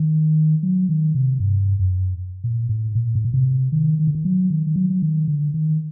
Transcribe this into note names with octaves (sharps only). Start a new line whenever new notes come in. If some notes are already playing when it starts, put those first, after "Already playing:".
Already playing: D#3
F#3
D#3
C3
G2
F#2
A#2
A2
A#2
A2
A#2
C3
D#3
D#3
D3
D#3
F#3
D#3
D#3
F#3
F#3
D#3
D3
D#3